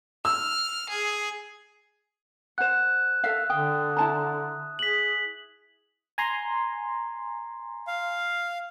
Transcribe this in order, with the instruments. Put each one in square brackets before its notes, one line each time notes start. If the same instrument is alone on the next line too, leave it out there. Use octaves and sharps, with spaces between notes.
[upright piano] E6 [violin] F6
[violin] G#4
[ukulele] C5 F#5 [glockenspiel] F#6 E7
[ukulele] A4 E5 F5
[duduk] D3 [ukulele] G5 [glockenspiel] D#6
[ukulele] E4 A5 A#5
[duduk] G#4 [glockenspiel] B6 F#7
[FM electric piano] G#5 A#5 C6
[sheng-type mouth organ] F5